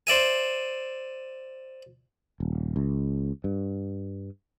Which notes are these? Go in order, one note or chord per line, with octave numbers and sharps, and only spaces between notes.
C5 D5 E5 G#5
D#1
C#2
G2